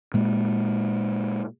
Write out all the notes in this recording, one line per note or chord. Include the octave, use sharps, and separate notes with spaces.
A#2 G#3 A#3